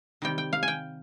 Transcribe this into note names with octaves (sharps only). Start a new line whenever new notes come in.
C3 D#3 G3 G5
G5
F5
G#5
G5